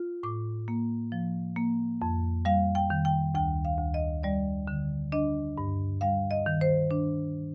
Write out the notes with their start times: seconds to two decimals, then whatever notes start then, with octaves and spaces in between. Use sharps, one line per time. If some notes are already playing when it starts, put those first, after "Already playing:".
Already playing: F4
0.23 A2 D6
0.68 A#3
1.12 F3
1.56 A#3
2.02 F2
2.45 G3 F5
2.75 G5
2.90 D#3
3.05 G5
3.35 D2 G5
3.65 F5
3.79 D2
3.94 D#5
4.23 G3 D5
4.68 D3
5.12 D4 D#5
5.58 G2
6.01 G3 F5
6.31 D#5
6.46 D#3
6.61 C5
6.91 D4